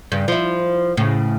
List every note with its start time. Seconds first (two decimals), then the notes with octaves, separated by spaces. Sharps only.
0.12 G2 C#3
0.28 F3 E4
0.97 A2 C#3